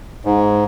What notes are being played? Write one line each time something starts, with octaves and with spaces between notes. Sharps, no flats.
G#2